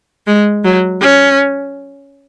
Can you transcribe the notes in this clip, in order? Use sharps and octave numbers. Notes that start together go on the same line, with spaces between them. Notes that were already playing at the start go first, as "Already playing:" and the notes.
G#3
F#3
C#4